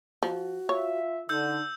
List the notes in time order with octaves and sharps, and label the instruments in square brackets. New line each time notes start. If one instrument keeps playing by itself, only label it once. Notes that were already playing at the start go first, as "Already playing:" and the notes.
[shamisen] F3 [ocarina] F#4
[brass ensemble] F4 E5 [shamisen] C#5
[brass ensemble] D3 [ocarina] D#4 [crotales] E6 G6